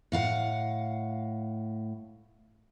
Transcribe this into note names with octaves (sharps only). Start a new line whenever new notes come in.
A2 F5 F#5